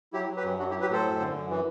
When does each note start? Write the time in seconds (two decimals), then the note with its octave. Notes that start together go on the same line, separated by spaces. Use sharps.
0.13 F#3 E4 G4
0.29 F#3
0.36 G4 B4
0.43 F#2
0.58 F#3 D4 F#4
0.70 E4 G4
0.74 F#3
0.81 G4 B4
0.89 A2 A4 C5
1.05 F#2
1.20 D3
1.34 F#2
1.50 E3